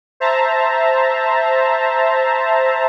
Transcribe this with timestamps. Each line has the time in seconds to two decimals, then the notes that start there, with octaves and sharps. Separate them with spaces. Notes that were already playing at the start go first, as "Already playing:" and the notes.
0.20 C5 E5 A5 A#5